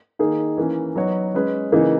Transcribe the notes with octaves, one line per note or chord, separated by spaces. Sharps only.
D#3 A#3 D#4 G#4
E3 A#3 C#4
F#3 B3 D#4 F#4 C#5
G#3 C#4 G#4 B4
C#3 E3 A#3 D#4 G#4